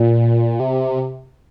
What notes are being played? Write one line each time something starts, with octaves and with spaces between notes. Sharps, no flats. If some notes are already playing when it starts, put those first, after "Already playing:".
Already playing: A#2
C3